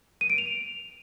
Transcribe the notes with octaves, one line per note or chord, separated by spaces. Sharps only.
D#7
D7
F7